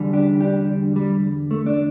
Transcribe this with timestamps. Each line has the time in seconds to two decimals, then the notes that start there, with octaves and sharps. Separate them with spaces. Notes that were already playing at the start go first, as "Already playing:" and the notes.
Already playing: E2 D3 G3
0.13 D4 G4
0.40 D4 G4
0.96 G3
1.51 A3
1.66 D4